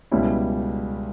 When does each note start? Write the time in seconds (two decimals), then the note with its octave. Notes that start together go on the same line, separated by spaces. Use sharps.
0.11 C#2 B2 G3 C#4 E4